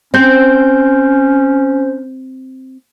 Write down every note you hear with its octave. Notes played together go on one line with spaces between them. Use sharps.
C4 C#4 C5 G6